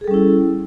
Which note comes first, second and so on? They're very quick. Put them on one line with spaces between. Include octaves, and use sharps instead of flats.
G#4 A4 G3 C#4 E4